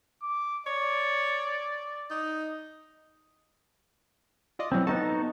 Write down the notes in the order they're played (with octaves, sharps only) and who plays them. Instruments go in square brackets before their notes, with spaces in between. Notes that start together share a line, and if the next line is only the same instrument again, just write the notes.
[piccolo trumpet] D6
[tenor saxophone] C#5 [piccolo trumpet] D5
[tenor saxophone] D#4
[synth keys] F4 D5 D#5
[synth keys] B2 E3 F#3 [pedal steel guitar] C4
[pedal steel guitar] B3 D#4 F#4 [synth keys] A4 A5